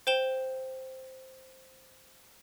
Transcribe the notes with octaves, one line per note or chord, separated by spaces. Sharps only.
C5 G5 E7 G7